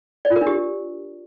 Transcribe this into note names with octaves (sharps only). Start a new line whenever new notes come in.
D5
F4
A#4
D4
G4